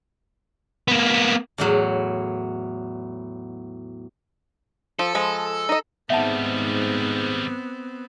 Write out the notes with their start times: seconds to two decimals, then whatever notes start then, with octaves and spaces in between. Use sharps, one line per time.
0.88 A#3 B3
1.58 E2 A2 F#3
4.99 F3 A4
5.15 F3 G#3 B5
5.69 D#4 D#5
6.10 G#2 D#3 G3 B3 C4 E5 F#5 A5